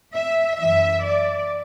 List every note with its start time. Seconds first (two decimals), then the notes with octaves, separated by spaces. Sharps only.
0.13 E5
0.58 F#2 E3 E5
1.03 D5